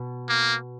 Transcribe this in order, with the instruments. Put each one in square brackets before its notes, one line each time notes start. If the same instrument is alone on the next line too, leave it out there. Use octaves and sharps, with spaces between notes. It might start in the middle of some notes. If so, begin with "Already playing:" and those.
Already playing: [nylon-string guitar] B2
[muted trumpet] A#3